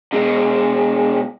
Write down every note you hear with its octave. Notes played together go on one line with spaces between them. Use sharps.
B2 G#3